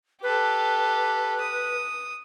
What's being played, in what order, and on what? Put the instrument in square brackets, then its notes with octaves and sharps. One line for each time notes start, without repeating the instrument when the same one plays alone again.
[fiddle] G4 A4 [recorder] B4
[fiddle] D#6